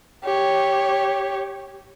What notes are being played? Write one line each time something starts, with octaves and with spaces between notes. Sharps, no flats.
G4 C#5